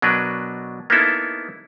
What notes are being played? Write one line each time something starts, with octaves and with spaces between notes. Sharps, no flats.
B2 F#3 D4 A#4 B4
A#3 B3 C#4 D#4 E4 A4